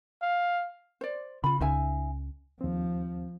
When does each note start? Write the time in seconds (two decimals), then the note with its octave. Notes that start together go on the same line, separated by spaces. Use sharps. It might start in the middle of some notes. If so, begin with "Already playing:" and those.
0.22 F5
1.01 C5 D5
1.44 C#3 F4 B5
1.60 C#2 C#3 D#4 E5 G#5
2.61 D#2 F3 C4